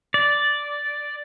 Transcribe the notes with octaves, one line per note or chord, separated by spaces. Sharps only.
D5